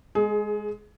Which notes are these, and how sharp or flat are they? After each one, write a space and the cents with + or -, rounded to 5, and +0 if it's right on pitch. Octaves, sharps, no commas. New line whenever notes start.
G#3 +0 G#4 +25